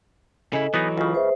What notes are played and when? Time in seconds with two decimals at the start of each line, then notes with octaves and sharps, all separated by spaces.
0.53 C#3 E4 A4 D#5 G#5
0.74 E3 F#3 B3 D#4
0.98 C#2 C#3 F4
1.14 G#4 B4 C5 E5